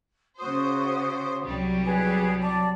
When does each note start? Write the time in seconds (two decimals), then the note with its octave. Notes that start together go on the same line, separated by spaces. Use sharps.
0.38 C#3 F#4 C5 D#6
1.45 C2 F#3 G3
1.84 G#4 B4
2.42 D5 A5